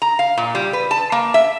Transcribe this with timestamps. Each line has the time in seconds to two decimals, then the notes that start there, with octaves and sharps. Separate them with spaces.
0.02 A#5
0.19 F5
0.38 A#2
0.55 G3
0.73 B4
0.91 A5
1.12 A#3
1.34 E5